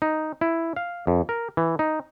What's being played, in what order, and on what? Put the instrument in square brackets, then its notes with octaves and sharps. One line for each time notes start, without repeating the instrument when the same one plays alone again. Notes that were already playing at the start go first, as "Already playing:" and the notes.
[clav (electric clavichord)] D#4
E4
F5
F2
A#4
E3
D#4